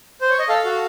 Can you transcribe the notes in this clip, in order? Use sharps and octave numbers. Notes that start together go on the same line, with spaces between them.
C5
C#5
D#5
A4 F5
F#4